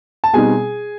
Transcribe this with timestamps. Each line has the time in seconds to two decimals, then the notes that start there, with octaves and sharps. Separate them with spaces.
0.24 A5
0.33 B2 G3 C4 D#4 G#4 G#5